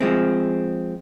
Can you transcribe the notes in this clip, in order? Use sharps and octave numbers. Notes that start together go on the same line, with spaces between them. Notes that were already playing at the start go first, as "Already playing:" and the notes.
F3 G#3 C4